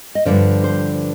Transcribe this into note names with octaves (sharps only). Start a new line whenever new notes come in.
D#5
G2 D3 F3 D5
C5